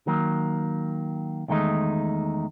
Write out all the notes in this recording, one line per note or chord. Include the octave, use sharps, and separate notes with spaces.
D#3 F#3 A#3
E2 D#3 G#3 A3 D#4